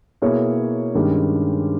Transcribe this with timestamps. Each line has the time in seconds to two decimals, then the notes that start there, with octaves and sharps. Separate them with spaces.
0.22 B2 A#3 E4 G#4 C#5
0.95 G2 D#3 G#3 C#4 G4